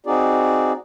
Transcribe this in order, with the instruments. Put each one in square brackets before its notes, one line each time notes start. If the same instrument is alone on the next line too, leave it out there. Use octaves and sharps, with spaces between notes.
[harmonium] C4 D#4 F#4 G#4 D5